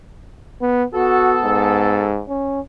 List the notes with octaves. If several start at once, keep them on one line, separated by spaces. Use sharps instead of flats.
B3
B3 F#4 A4
G#2
C#4